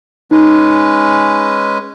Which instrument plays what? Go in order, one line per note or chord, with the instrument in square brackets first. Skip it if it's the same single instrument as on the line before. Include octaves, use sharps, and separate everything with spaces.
[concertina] G#3 C#4 B4 [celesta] D#4